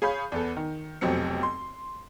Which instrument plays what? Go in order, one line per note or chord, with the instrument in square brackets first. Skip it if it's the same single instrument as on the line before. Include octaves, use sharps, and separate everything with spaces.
[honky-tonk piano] G#4 C#5 F5 B5 G6
E2 B3 A4
D#3
F1 B1 F2 F#3 C4 C#7
C6